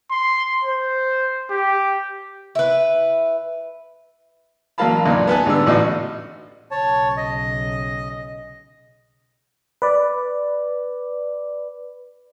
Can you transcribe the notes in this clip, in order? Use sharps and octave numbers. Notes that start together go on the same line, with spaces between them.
C6
C5
G4
E4 B4
A1 F#3 A#3 F5 A5 B5
B1 F#2 A#2 D4 D#4
B3 D#4 B4 G#5 A5
G#2 D3 G3 B3 E6
A1 A2 D4 F#4 D#5
B1 C#3 C#5 A5
D#5
B4 D5